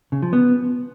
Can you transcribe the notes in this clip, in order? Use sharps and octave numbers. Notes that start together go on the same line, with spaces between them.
C#3
F3
B3